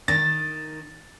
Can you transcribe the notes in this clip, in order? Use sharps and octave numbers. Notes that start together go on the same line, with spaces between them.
D#3 A6